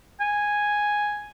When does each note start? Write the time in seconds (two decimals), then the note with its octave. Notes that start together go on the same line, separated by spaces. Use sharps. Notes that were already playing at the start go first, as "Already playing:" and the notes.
0.21 G#5